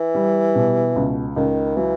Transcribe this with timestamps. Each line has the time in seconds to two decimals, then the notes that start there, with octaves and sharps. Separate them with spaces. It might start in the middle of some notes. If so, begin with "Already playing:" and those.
Already playing: E3
0.15 G3
0.55 B2
0.96 C#2
1.36 C#2 D#3
1.77 E3 F#3